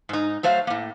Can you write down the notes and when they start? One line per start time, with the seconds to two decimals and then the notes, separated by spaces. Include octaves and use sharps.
0.09 G#2 D#4
0.43 F#3 A3 C5 F5
0.67 A2 A#3